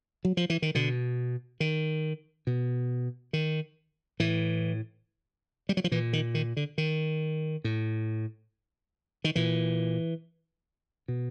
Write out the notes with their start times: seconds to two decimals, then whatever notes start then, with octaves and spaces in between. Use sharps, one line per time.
0.25 F#3
0.37 F3
0.50 E3
0.62 D#3
0.75 B2 D3
1.60 D#3
2.47 B2
3.33 D#3
4.20 A2 E3
5.69 G3
5.77 F#3
5.84 F3
5.92 A#2 E3
6.13 D#3
6.34 D#3
6.57 D3
6.78 D#3
7.64 A2
9.24 D#3
9.35 A#2 E3
11.08 B2